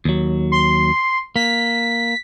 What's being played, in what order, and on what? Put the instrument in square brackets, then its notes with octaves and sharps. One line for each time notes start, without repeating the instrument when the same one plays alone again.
[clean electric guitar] D#2 F#3
[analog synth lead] C6
[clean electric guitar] A#3 [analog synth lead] B6